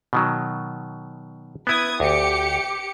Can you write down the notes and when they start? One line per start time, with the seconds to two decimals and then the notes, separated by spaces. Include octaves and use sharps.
0.13 B2 D#3 F#3
1.67 B3 E4 B4 D#6 G#6
2.00 D2 G4 D6 C#7